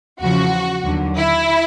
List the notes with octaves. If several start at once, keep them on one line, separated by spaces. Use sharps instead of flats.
E2 C#3 F3 F#4
D#2 D3 F#3
E4